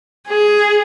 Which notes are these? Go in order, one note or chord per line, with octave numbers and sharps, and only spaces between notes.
G#4